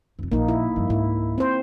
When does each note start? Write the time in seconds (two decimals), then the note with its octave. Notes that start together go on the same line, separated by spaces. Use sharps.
0.19 F1 F2
0.32 A#1 A#3 D#4
0.48 E4
0.76 G2 F3
0.90 C#2 G#2 E4
1.38 C4 C5